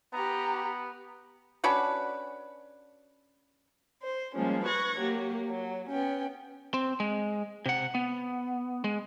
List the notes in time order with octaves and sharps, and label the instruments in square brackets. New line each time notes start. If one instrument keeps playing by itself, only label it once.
[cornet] B3 [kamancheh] G4 A#5
[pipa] C#4 D4 F#4 B4
[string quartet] C5
F3 G3 G#3 A#3 C#4
B4 C#6 F#6 G#6 A#6
F#3 A#3 G4
F#3
B3 C#4 G5
[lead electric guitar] C4
G#3
C3 F#5
B3
G#3